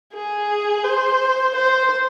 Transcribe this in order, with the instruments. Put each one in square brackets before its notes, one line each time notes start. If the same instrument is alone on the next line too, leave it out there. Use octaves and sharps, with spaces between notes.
[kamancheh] G#4
C5
C5